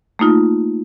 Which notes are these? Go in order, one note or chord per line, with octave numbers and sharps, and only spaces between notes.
A3 A#3 D#4 F4